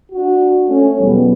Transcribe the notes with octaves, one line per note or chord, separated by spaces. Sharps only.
D4 F#4
A3 C#4
E2 B2 F#3 G3 B3